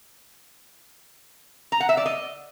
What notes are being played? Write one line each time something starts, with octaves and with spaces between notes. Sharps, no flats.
A#5
F#5
E5
D5
D#5